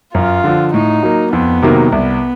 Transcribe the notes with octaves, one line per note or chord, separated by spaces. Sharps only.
F#2 F4
D3 F3
A2 D#4
F#3 A#3
F2 B3
C3 D#3 F#3 A#3
C2 B3